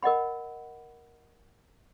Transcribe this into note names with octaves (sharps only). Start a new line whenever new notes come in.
A#4 D#5 F#5 B5